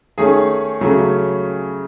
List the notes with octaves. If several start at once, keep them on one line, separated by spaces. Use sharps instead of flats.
D#3 A3 C#4 G#4
C#3 F#3 A3 C#4